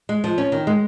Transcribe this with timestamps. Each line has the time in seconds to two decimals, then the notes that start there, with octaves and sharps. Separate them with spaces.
0.09 G#3
0.24 F3
0.38 C#4
0.52 D#3
0.67 G#3